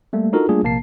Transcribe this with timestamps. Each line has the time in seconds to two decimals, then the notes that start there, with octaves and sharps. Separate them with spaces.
0.13 G3 A3 A#3
0.33 D4 D#4 F4 F#4 A4 A#4
0.49 G3 A3 A#3 D4 F4 G#4
0.63 A#1 C3 A#3 A5 C7